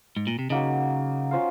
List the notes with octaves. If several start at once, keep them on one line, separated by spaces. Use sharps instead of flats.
G#2
A#2
C3
C#3 F#3 A#3 D#4
C#4 F4 C5 F5